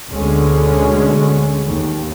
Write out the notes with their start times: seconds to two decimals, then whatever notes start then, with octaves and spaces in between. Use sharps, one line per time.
0.11 D2 B2 D3 G#3 C#4
1.66 D#2